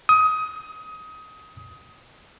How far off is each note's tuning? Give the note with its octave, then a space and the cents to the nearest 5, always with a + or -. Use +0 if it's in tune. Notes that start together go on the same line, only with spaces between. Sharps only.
D#6 +20